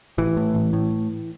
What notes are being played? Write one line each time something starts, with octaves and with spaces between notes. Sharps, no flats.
A1 E3
A2
A1
A2